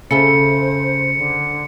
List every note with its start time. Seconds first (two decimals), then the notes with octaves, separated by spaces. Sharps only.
0.11 C#3 A4 C5 E5 C#7
1.17 D3